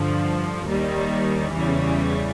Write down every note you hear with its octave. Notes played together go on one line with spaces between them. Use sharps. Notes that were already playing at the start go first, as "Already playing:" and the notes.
Already playing: G2 D3 F3
D#2 D#3 G3
E2 C#3 E3 G3